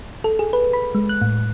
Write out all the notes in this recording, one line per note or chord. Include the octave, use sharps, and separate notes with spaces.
A4
G#4
B4
B5
G#3
F#6
A2